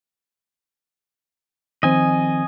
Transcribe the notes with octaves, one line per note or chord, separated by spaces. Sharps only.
D#3 F3 C4 D#5 G#5